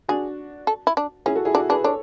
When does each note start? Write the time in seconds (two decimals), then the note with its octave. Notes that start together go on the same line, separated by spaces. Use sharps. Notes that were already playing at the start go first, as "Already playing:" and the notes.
0.08 D4 F#4 G#4
0.67 A4
0.87 E4
0.97 D4
1.26 C#4 E4 G#4
1.35 F#4 A4
1.45 E4 G#4
1.55 D4 F#4 A4
1.69 D4 G#4 B4
1.84 D4 A4 C#5